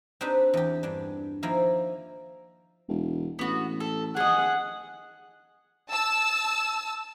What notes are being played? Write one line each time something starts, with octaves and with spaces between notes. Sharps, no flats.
C4 D4 D#4 G4 B4 C5
E2 G4
G2 D4
D#3 F3 A#3 E4
E1
A1 B3 F#4
A4
G#4 D#5 F#5
A5 E6